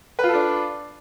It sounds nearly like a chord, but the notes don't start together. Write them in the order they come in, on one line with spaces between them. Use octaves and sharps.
B4 F4 A4 D4